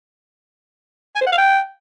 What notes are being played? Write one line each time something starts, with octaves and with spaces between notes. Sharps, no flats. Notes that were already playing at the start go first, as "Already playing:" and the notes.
G#5
C5
F#5
F5
G5